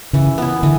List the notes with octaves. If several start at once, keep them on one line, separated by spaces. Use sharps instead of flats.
C#3 E3
B3 E4
D3 E3